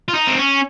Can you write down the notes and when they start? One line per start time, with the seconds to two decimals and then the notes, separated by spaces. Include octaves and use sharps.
0.08 F4
0.14 D#4
0.27 C4
0.38 C#4